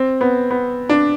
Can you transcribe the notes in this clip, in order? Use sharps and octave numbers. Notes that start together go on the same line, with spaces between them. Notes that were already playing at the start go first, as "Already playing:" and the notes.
Already playing: C4
B3
B3
D4